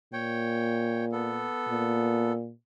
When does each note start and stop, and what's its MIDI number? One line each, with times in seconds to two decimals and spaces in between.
0.13 1.48 46
0.13 1.05 73
0.13 1.05 79
1.12 2.32 59
1.12 2.32 69
1.69 2.52 46